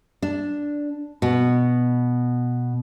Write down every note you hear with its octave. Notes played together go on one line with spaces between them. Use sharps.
D4
B2